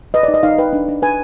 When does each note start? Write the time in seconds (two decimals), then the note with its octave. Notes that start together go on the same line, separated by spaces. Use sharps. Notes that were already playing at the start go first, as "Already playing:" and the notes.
0.14 B4 D#5
0.23 D#4 D5
0.34 D#5
0.43 D#4 F5
0.58 B4 G5
0.73 D4
0.89 D4
1.02 B4 G#5